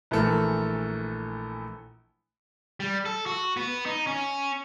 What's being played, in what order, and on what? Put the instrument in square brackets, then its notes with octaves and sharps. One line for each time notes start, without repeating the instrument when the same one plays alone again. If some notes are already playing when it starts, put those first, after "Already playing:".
[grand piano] A#1 E3 A3 A4 A#4
[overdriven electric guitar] G3
A4
F#4
B3
D#4
C#4